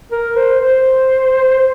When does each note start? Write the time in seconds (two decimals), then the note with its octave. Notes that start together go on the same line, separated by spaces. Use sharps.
0.12 A#4
0.37 C5
0.61 C5
1.59 C5